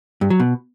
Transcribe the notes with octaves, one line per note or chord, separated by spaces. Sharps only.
G2
F#3
B2